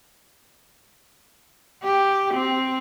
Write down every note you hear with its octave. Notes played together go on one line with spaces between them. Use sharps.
G4
C4